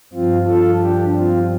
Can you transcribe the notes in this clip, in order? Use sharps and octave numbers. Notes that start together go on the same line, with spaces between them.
G2 F3 C4 F4
F4 A4
D4 G4
C4 F4